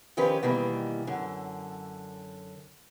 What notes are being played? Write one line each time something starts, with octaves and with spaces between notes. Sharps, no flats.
D#3 F3 C#4 G4 A#4 B4
B2 D#3 E3 G3 A#3
F#2 D3